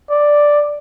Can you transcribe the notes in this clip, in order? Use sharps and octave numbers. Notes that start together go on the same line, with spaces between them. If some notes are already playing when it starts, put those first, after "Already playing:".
D5